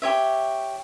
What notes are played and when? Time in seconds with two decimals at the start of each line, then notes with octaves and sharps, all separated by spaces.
0.02 G4 C#5 E5